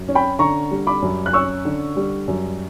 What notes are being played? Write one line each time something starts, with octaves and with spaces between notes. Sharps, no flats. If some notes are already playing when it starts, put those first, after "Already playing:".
Already playing: F#2
C#4
G5 B5
D3 A#5 C#6
G3
B5 D6
F#2
F#6
C#4 C#6 E6
D3
G3
F#2